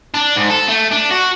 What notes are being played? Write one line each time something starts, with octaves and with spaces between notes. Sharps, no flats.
D4
G#2
A4
A3
D4
F#4